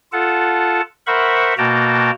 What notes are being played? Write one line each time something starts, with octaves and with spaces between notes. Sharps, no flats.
F4 A4 F#5 A5
A#4 C5 E5 F#5 B5 C#6
B2 A#3 F#4 G5 A5 A#5